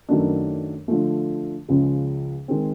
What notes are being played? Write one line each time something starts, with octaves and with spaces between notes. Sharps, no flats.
F#2 D#3 F#3 A3 D4
D3 F3 A3
C#2 C#3 F3 G#3
D#3 G#3 C4